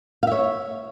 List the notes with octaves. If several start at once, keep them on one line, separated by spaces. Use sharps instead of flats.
C#5 E5 F5